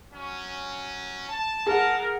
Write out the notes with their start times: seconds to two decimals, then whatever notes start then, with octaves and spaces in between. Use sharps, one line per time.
0.13 F#3 C#4
1.28 A5
1.66 G#4 A#4 F#5